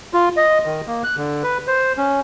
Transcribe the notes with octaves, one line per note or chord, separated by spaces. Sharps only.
F4
D#5
D#3
A#3
F#6
D3
B4
C5
C#4